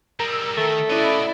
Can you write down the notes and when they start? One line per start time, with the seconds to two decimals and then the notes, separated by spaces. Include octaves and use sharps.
0.20 G3 G#3 A#4 A#5 E6
0.57 D#3 A3
0.90 C#4 E4 F#4 D5 D#5